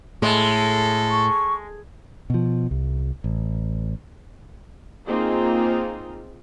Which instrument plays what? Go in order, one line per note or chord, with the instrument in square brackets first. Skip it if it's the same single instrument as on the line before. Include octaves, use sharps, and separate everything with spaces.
[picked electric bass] A2 [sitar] G#3 [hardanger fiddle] A4
[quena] C#6
[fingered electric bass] B2 F3
C2
A1
[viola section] A#3 C4 D#4 F4 G#4